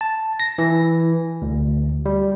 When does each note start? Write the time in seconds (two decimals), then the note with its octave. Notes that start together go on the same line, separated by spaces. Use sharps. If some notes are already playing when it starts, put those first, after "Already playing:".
0.01 A5
0.40 A#6
0.58 E3
1.42 D2
2.06 G3